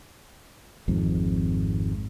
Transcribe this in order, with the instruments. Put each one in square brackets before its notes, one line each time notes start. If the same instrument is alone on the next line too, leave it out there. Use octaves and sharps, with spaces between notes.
[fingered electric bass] G#1 F2 G#2